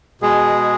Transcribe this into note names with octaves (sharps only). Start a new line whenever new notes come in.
B2 G#3 G#4